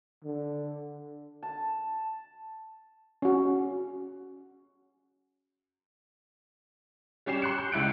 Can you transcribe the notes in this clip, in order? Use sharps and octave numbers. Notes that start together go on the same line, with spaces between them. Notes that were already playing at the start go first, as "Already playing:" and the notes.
D3
A5
C#4 F#4
G3 C#4 G4 C7 E7
C6 F#6 C#7
G6
C#2 G#3 E4 F#6 C#7 D7